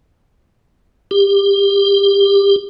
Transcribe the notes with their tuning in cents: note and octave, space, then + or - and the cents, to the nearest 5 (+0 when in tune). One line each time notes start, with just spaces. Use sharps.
G4 +25